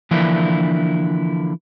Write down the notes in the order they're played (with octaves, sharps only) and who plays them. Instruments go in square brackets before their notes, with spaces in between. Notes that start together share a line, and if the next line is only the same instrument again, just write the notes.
[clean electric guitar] D3 E3 F3 A#3 D4 E4